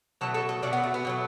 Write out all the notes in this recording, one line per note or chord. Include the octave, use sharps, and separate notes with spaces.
B2 F#3 A3 A4
A4
A4
B2 F#3 A3 D4
B3
A3
B3
B2 F#3 A3